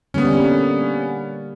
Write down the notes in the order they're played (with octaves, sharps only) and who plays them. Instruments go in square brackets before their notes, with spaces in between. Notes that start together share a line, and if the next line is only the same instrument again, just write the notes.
[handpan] D3 G3 A#3 [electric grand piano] B3 C#4